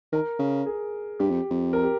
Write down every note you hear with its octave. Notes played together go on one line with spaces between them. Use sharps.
D#3 A#4
C#3
G#4
G2 G4
F2
F2
A#4
G4